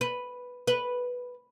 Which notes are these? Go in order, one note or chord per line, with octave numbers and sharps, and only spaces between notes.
B4
B4